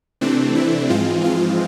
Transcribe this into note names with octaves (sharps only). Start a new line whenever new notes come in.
C3 E3 A3 C4 D4
E4
G#2 E3 F3 G#3 C4 F4
F3 F4